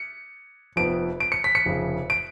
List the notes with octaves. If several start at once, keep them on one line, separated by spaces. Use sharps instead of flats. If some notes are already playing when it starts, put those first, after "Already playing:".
Already playing: C#7
F1 F2 F3 B3 D7
D7
C#7
B6
C#7
F1 F2 C#3
D7